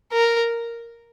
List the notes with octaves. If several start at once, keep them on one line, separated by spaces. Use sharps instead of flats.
A#4